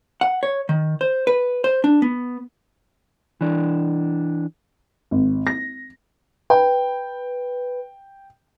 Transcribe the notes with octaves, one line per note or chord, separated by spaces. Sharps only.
F#5
C#5
D#3
C5
B4
C5
D4
B3
E3 D4
G#1
A#6
B4 G5